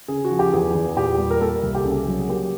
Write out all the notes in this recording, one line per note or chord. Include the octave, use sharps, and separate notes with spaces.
C#3 G#4
F#4
F3
G4
E2 G#4
E2
A#2 G4
G3
A#4
A#3 A4
C2
G4
C#3 G#4
F#3
G#4
A#3 G4